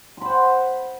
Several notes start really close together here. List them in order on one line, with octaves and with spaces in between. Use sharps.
C6 B5 C5 F#5